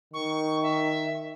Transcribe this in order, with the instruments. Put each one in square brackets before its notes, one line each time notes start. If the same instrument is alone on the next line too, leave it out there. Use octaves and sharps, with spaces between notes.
[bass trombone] D#3 [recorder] C#6
[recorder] E5